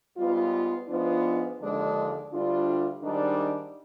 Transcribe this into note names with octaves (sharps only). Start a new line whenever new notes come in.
G#2 G3 B3 F4
G#2 F3 B3 D4 F4
D#2 D3 F3 G#3 D4
D2 D3 G3 D4 F4
G#2 D#3 G3 D4